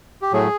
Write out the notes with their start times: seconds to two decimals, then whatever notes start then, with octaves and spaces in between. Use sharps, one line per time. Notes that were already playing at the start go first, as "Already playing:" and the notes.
0.22 G4
0.32 A2 F#3 A3 G#4